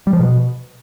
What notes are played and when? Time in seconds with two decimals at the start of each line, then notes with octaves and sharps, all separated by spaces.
0.07 G3
0.13 F3
0.19 B2